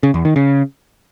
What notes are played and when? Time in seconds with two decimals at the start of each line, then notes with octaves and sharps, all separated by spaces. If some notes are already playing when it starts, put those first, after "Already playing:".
0.03 C#3
0.14 E2
0.25 D#3
0.36 C#3